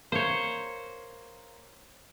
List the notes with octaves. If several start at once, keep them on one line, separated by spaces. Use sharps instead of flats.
A#3 C5 C#5